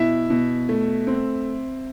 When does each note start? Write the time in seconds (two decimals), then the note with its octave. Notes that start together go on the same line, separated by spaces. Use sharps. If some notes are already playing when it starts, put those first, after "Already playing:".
Already playing: B2 E4 E5
0.30 B2
0.69 A3
1.07 C4